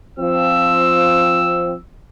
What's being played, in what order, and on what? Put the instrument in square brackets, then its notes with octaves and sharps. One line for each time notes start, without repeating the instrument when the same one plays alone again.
[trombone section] F3 C4 [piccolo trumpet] E6